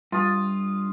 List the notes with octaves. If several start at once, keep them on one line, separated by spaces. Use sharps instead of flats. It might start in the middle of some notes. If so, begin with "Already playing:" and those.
G2 F4 D#6